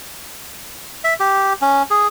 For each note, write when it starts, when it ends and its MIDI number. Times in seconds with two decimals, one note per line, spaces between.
1.04 1.14 76
1.20 1.53 67
1.61 1.83 61
1.90 2.07 68